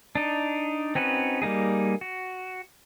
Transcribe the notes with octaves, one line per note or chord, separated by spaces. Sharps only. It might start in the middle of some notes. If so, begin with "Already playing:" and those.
D4 D#4
C4 C#4 D#4 F#4 B4
G3 A#3 D#4 G#4
F#4